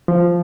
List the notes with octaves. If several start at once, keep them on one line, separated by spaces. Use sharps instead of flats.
F3